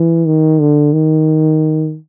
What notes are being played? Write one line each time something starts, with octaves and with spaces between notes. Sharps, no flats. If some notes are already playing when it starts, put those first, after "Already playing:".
Already playing: E3
D#3
D3
D#3